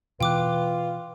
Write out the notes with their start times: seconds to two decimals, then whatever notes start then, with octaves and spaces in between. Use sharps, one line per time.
0.20 B2 E3 F4 B4 G5 D6 F#6